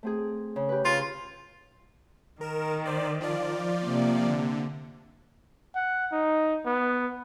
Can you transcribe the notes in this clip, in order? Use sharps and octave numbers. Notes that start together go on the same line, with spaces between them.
A3 C4 G#4
C#3
G4 B4
C#3 F4 G#5
D#3 A#4 E7
C5 D5
F3 F4 D5
C3 A#3
D3
F#5
D#4
B3